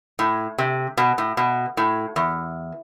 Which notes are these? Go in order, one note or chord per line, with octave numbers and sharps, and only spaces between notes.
A2
C3
B2
A2
B2
A2
E2